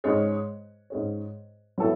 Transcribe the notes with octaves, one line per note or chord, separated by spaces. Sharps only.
G#2 G#3 C#4 G#4 C#5
G#2 G#3 C#4 G#4 C#5
F#3 B3 E4 A4